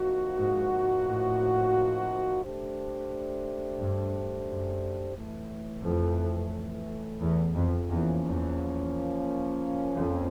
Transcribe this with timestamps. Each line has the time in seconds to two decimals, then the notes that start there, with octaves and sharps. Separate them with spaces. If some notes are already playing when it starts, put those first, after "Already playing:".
Already playing: C3 F3 A#3 D#4 F#4
0.36 G#2
1.05 A2
2.42 A3 D4 G4 C5
3.78 G2
4.47 F#2
5.15 A2 E3 A3
5.83 F2
7.20 E2
7.55 F2
7.89 E2 F3 A#3 C#4
8.23 E2
9.94 F2